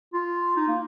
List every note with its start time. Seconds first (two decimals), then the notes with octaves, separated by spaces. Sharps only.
0.13 F4
0.56 D#4
0.68 A#3